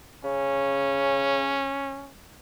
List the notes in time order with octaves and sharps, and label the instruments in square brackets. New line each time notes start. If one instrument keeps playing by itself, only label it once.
[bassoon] C#3 [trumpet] C#4